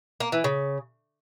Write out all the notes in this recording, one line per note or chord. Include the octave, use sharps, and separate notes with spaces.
A#3
E3
C#3